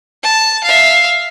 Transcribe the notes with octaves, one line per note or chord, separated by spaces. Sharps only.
A5
E5 F5